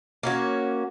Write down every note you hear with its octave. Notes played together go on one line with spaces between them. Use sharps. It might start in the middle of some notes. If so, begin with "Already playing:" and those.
A#3 C#4 F#4